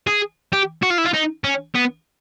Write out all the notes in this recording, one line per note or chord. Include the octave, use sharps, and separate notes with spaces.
G#4
G4
F#4
F4
E4
F4
D#4
C#4
B3